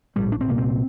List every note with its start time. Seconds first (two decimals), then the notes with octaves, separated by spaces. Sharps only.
0.16 A#1 A2 G3
0.32 D4
0.41 C4
0.48 C2 A#2 A#3
0.58 C4